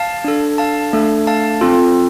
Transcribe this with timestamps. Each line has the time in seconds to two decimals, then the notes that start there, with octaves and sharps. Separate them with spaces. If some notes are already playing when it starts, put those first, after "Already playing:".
Already playing: F5 A5
0.24 D4 A4
0.58 F5 A5
0.93 A3 D4 A4
1.27 F5 A5
1.61 C4 F4 A4